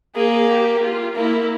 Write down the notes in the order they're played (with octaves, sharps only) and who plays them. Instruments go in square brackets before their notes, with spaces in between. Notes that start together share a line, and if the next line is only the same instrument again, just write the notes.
[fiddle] A#3 [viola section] G#4
[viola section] G4
F4
[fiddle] A#3 [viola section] E4